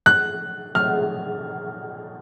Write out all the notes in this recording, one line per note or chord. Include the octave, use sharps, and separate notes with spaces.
F#6
F6